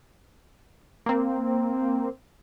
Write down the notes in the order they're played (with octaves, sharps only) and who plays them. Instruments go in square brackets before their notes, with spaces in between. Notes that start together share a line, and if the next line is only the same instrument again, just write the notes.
[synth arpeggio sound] A#3 C4